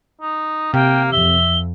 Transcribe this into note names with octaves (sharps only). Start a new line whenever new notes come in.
D#4
C3 A#3 G5
F2 E5 G7